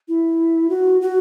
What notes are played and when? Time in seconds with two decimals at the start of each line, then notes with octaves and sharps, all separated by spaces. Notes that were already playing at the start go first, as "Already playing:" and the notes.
0.09 E4
0.70 F#4
1.01 F#4